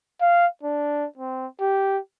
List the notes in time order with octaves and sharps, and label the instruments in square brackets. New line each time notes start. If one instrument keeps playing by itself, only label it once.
[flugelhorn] F5
D4
C4
G4